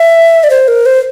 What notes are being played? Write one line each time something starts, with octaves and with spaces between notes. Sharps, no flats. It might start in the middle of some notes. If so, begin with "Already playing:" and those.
Already playing: E5
D5
C5
A#4
C5